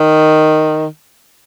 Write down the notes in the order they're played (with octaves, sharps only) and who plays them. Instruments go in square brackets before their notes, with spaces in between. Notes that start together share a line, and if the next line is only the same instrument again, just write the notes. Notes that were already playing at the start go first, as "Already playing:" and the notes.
Already playing: [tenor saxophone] D#3